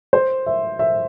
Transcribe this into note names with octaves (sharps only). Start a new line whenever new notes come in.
C5
E5
E5